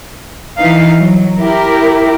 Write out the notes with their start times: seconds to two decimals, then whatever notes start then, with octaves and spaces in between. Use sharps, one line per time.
0.58 E3 D#4 B4 F5
1.00 F#3
1.38 E4 G4 A#4